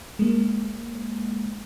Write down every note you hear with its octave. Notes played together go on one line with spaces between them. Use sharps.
G#3 A#3